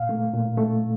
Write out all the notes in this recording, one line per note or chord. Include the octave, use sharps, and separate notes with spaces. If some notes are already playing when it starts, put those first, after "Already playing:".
Already playing: A#2 F5
A3
A#2
A3